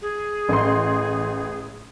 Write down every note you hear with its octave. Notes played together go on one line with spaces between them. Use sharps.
G#4
A1 C6